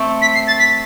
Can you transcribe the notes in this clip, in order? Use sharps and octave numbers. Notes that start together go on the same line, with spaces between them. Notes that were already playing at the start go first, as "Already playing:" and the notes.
Already playing: A3 C4
B6
C7
A6
B6